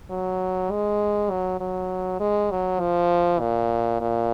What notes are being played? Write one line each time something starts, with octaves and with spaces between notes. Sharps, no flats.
F#3
G#3
F#3
F#3
G#3
F#3
F3
A#2
A#2